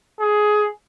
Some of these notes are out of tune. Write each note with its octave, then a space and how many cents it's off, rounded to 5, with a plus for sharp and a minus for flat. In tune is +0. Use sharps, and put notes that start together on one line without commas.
G#4 +15